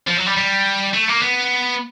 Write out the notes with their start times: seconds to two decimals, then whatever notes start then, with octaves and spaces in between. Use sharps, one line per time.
0.07 F3
0.17 F#3
0.26 G3
0.37 G3
0.93 A3
1.09 A#3
1.22 B3